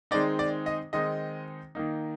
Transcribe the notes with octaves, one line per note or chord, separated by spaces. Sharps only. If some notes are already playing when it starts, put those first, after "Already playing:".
D#3 G#3 C4 D#4 D5
D5
D#5
D#3 G#3 C4 D#4 D#5
D#3 A#3 D#4